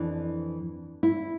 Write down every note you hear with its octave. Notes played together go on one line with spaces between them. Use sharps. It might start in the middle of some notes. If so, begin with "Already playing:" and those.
Already playing: F2 E3 D4
E4